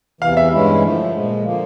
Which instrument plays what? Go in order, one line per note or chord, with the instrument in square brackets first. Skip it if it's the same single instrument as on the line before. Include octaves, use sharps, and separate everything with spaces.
[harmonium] E2 C3 E3 [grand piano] F5
[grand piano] E5
[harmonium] G2 E3 G#3 C#4 E4
D3 F3 A3
A#2 F3 G#3
D3 F3 A#3